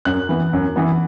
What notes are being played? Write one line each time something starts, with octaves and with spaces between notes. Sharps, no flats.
F#2 F#6
E3 B3
F#2
E3 B3